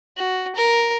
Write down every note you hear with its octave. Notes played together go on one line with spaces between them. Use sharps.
F#4
A#4